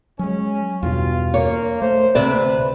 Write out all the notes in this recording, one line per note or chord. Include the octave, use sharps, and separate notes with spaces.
F#3 G#3 C#4
E2 G2 B2 F4
A#3 C#5
A3 C5
D2 C3 B4 D5 E5